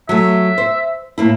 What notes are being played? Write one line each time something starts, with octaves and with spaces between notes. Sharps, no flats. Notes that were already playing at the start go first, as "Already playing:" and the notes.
F#3 A3 E5
C5
A2 A#3 E4